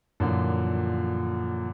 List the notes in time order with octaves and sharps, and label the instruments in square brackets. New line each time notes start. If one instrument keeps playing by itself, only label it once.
[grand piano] F#2 A#2 D3 E3 F3